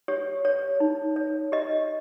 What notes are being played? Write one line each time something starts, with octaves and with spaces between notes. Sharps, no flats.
G4 C#5
C#5
D#4
C#5
G4 D#5